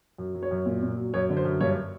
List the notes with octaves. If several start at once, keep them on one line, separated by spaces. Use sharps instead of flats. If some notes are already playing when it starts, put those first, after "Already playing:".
F#2
F#3
C#5
F#2
A#2
A#2
F#3
F#2 C#5
D3
C5
F#2
G2 C#5